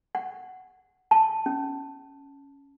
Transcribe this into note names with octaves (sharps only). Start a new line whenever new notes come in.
F#5
A5
C#4